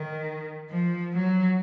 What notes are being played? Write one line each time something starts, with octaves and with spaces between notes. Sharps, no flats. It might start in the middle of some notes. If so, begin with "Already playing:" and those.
Already playing: D#3
F3
F#3